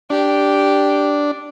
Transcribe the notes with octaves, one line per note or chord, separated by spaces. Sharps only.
D4 G4